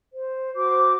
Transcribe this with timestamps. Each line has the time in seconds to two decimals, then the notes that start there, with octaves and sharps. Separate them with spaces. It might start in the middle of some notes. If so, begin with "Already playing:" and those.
0.11 C5
0.54 F#4 C5 D6